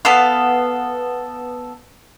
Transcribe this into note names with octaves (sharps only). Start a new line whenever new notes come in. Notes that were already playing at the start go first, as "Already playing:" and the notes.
B3 A4 F5